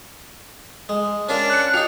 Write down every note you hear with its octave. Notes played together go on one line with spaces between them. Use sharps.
G#3
C#4 D4 F4 A#4
F#6 C#7
D#4 F4 G4